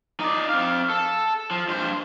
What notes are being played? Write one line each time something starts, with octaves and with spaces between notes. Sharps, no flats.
D#4 D5
C4 F5
A4
F3
G2 C5